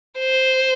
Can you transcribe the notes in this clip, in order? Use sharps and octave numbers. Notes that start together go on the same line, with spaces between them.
C5